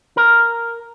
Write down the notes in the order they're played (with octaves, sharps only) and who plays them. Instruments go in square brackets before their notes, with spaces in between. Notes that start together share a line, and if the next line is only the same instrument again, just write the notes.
[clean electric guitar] A#4